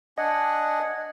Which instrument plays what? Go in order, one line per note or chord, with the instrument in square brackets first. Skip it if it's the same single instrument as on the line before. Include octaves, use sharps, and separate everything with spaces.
[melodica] D4 F#5 G#5 [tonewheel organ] D#5